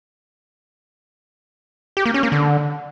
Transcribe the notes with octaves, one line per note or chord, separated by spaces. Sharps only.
G4
A#3
C#4
A#3
D3